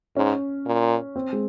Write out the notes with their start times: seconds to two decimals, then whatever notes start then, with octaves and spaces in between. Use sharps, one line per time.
0.16 G#2 C#4
0.66 A#2
1.16 C4
1.33 G#3